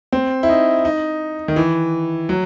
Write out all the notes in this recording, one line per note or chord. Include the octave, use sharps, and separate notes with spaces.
C4
E4
D#4
D#4
D#3
E3
F#3